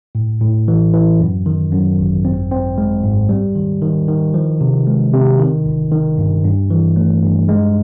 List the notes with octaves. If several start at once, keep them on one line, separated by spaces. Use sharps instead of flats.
A2
A2
E3
E3
F#2
D#3
F#2
G#1
C4
C4
G#3
G#2
G3
D#3
D#3
D#3
F3
C3
G#3
C3
D#3
G1
D#3
G2
G2
E3
A3
G2
G#3